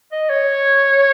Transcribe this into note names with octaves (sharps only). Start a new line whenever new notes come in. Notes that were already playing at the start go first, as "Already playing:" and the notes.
D#5
C#5